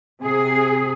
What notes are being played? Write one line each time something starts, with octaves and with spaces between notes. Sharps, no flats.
C3 G#4